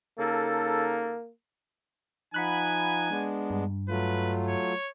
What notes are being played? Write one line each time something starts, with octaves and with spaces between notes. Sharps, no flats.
C#3 A#3 D#4 A4
F3 D#4 F#5 G#5 B5 F#6
G#3 B3 D4
G2
F#3 A3 F4 B4
C#5